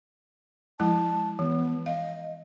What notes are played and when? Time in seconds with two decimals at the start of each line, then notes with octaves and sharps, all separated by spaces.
0.80 F3 G#3 E4 A5
1.39 E3 B3
1.86 D#5 F5